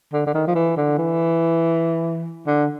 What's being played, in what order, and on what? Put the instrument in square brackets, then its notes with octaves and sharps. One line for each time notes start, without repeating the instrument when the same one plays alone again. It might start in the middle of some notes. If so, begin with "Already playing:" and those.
[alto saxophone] D3
D3
D#3
F3
E3
D3
E3
D3